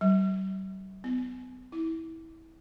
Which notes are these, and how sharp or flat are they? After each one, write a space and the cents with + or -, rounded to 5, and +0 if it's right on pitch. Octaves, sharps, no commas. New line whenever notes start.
G3 -45
B3 +40
E4 -20